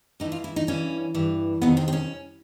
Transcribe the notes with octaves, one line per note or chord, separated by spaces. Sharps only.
A2 E3 D#4
F4
E4
D#4
G2 E3 C#4
G2 E3
F2 C3 D#3 B3
C4
C4
C#4